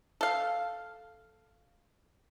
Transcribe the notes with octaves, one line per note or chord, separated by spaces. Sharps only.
A4 F5